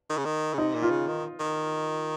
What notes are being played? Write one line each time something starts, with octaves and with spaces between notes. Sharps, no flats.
D#3
C#3
D#3
C#3
C3 D#4
A#2
F4
C#3
D#3
D#3